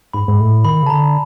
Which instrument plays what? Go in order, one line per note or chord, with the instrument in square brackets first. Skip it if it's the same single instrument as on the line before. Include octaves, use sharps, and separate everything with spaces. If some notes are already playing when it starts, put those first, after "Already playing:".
[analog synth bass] G#2 [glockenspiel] B5
[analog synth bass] G#2
A2
[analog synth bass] D#3 [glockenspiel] B5
[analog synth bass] C#3
[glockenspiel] A5
[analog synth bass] D3 [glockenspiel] A#5